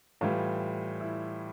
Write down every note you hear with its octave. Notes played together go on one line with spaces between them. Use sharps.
A2 E3 G3 F4
E4